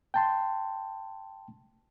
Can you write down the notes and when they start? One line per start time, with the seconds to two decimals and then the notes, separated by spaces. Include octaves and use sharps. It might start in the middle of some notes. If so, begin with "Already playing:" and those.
0.14 G5 A5 C6